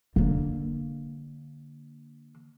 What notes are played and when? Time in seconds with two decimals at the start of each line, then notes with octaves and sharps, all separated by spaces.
0.16 D3 A#3